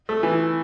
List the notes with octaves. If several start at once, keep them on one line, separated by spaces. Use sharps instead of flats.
A3
E3